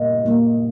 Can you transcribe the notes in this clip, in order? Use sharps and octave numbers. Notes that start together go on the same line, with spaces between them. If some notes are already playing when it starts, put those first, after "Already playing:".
Already playing: A#2 A#3 D#5
A#2 A#3